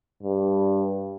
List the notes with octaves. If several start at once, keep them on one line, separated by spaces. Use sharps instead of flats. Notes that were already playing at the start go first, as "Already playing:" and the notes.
G2